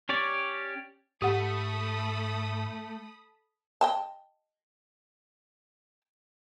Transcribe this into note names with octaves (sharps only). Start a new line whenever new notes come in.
C#4 G4 C#5 D5
G#2 A3 G4 A4 F#5 B5 D#6
D#5 G5 A5